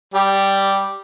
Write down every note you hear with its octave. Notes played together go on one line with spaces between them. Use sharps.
G3 G4